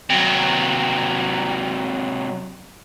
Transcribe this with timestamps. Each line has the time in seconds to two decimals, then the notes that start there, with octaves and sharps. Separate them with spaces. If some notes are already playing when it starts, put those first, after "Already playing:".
0.09 C3 F#3